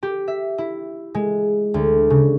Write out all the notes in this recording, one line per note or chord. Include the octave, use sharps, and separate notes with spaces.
G4
E5
E4
G#3
D2
C#3